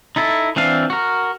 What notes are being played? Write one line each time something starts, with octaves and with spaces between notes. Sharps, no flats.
D#4 E4 A4
E3 C4 D4 F5
F#4 A#4